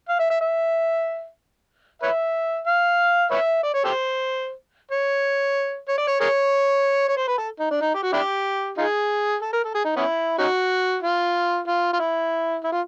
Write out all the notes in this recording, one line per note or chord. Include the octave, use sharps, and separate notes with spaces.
F5
E5
E5
E5
B4 C#5 E5
F5
B4 C#5 E5
D5
C#5
G4 A4 C5
C#5
C#5
D5
C#5
G#4 A#4 C#5
C#5
C5
B4
A4
D#4
D4
D#4
G4
F#4
D4 E4 G4
D#4 F4 G#4
A4
A#4
A4
G#4
D#4
B3 C#4 E4
C#4 D#4 F#4
F4
F4
F4
E4
E4
F4